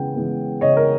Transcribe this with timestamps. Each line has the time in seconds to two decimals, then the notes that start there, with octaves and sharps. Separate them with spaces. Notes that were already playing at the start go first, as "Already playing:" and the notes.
Already playing: C#3 E3 G#3 B3 G5
0.16 E3 G#3 B3
0.61 C#3 C#5 D#5
0.77 A#4